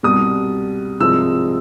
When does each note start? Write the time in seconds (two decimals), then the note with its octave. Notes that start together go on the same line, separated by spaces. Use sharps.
0.03 C2 B2 G3 D#6
1.00 C2 C3 F3 G#3 E6